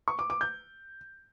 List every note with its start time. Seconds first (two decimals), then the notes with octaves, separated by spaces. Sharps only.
0.08 C#6
0.19 D6
0.30 D6
0.41 G6